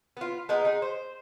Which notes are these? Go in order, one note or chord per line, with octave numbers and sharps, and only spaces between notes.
B3 F4
G#3 B3 D#4 F4
D#4 G#4
C5